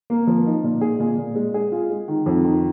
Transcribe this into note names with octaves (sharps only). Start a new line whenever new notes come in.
A#3
F3
D#4
A#2
G#4
A#2
A#2
G#3
G#4
F4
G#3
D#3
F2
D#3